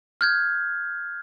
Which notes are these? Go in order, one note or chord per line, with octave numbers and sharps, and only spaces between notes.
F6 G6 G#6